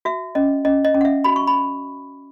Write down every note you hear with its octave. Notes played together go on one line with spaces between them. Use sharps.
F#4 E5
C#4 D#5
C#4 D#5
D#5
C#4
F#5
E5
F#4 B5
C#6
B5